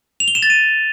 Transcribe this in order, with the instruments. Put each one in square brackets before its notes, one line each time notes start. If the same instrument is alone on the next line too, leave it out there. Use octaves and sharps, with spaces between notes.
[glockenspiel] F7
G7
E7
A6
D#7